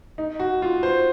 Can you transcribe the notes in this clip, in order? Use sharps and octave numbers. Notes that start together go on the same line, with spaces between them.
D#4
F#4
F4
C5